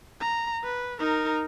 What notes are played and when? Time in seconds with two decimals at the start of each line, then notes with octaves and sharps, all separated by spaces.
0.20 A#5
0.63 B4
0.99 D#4 A#4